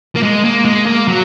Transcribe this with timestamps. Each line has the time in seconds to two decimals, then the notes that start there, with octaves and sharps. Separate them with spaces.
0.16 A#3
0.23 G#3
0.44 A#3
0.65 G#3
0.86 A#3
1.08 F#3